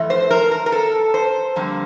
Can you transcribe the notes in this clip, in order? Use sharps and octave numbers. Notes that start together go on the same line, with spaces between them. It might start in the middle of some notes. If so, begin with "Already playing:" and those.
Already playing: F2 E3 A3
C5
A#4
A#4
A#4
A4
C5
F2 D3 G3 A#3